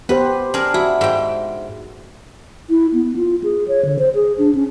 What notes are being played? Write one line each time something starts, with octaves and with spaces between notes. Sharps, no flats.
B3 G4 B4 C5
D4 G#4 A#4
E4 F#4
G#2 G5
E4
B3
F4
G#4
C#5
D3
C5
G#4
D4
C#4